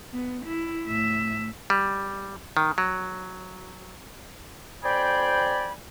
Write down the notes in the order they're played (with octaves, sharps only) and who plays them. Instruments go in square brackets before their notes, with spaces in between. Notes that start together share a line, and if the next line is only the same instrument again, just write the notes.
[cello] B3
E4
A2 E5
[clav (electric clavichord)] G3
D#3
F#3
[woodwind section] F2 C5 D5 G5 G#5 B5